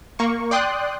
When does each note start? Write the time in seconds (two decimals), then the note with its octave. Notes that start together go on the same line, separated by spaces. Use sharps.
0.19 A#3 C#6
0.51 D5 G5 C6 D#6 F#6